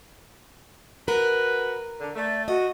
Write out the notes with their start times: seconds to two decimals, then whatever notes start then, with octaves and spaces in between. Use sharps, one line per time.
1.08 F#4 A#4 B4
2.00 D3
2.16 A3 D5
2.48 F#4 D#5